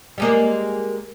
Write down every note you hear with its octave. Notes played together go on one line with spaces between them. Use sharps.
G3 G#3 A#3